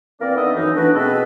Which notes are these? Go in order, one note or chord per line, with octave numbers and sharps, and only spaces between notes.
E3 A#3 C4 A#4 D5
B3 D4 D#4 A4 D#5 E5
F#2 E3 D#4
A3 B3 D4 E4 F#4 B4
B2 G#3 C4 G#4 A4 B4